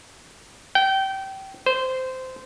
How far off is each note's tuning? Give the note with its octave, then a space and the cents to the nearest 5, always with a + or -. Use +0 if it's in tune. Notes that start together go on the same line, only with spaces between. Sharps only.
G5 -25
C5 -15